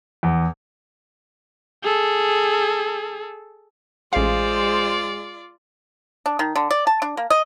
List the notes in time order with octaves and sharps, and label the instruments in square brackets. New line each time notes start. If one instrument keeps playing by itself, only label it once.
[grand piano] E2
[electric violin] G#4 A4
[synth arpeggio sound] A1 F5 [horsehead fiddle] G#3 [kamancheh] F4 D5 [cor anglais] C5
[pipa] D4
D#3
D3
D5
A5
D4
A#3
D#5